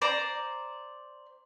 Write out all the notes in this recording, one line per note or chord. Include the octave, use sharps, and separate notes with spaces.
C5 D5 A#5